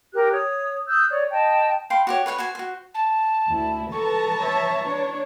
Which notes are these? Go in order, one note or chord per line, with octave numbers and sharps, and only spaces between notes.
G4 A#4 F#6
C#5 D#6
D#6 E6 F#6 G6
C#5 D5
D#5 G5 A5
F5 G5 B5 C6
F#4 G4 C#5
B4 C#5 F#5 G#5
F#4 C5 G#5
F#4 C5
A5
D2 E4
A4 B4 A5 A#5 C#6
C#5 E5
D4 C#5